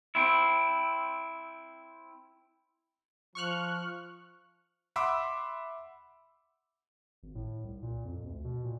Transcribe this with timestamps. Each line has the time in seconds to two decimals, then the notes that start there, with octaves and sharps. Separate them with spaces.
0.15 C4 E4
3.35 F3 C#6 F6 F#6
4.96 E5 F#5 B5 C6 D6 E6
7.23 G#1
7.35 A2
7.64 C2
7.83 A#2
8.05 F2
8.24 D2
8.44 B2
8.64 A#2